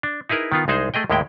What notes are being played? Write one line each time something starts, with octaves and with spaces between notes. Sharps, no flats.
D4
D#4 E4 G#4 A#4 B4
D#3 B3 F4
C2 G#3 D#4 G#4 C5
A3 G#4 D#5 G5
D#2 A2 G#3 E4 G5